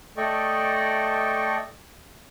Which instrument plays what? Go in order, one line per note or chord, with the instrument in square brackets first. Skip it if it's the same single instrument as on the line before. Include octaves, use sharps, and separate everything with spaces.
[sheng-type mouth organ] A3 A4 D5 D#5 G5 C#6